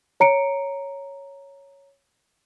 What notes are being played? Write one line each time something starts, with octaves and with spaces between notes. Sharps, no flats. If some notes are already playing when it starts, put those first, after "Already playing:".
C#5 A#5 C#7 D7